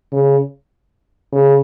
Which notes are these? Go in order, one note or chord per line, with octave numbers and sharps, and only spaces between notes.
C#3
C#3